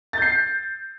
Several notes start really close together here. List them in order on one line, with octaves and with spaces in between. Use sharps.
A6 G6 C7